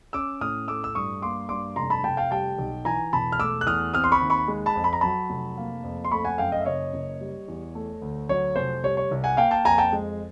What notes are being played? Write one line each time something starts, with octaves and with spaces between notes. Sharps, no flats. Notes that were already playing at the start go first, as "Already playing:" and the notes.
C#4 D6 E6
A2 D#6 F6
A3 D6 E6
E6
G2 C#6 D#6
A#3 C6 D6
G2 C6 D6
F1 A#5 C6
A5 B5
F1 G5 A5
F5 G5
G3 G5 A5
B1
E3 G#5 A#5
E1 A5 B5
F6
A3 D6 E6
F#6
E2 D#6 F6
C4 D#6 F6
C6
B5 C#6
D#2
B5 C#6
G#3
A5 B5
F2
B5
A#5
F#3 A5 B5
F1
A#3
F2
C6
A3 B5 C#6
F#5 G#5
F#2 F5 G5
D#5 F5
E5
F#1 C#5 D#5
F#1
G3
E2
A3
D2
F#3 C#5
F1 C5
G3 C#5
C#5
C2
F#5 G#5
A#3 F5 G5
G5 A5
F2 G#5 A#5
G5 A5
G#3